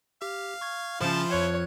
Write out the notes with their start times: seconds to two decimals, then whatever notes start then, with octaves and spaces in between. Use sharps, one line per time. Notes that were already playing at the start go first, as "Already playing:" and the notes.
0.22 G4 F5
0.61 C#6 G#6
1.01 C#3 F3 C#4 E4 F4 C5 A5
1.31 F2 C#5 F#6 G#6